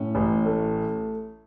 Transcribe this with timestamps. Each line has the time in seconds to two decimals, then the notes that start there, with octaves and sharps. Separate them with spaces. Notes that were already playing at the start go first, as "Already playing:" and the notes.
Already playing: A2 C#4
0.15 A1
0.45 A3